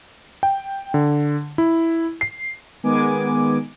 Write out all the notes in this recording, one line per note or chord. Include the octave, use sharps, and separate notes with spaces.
G5
D3
E4
C7
D#3 G#3 B3 G#5 D6